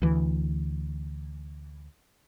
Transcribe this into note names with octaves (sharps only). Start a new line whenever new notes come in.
D2 E3